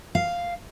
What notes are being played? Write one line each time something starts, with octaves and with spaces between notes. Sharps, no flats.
F5